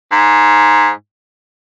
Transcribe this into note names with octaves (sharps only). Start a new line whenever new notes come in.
G#2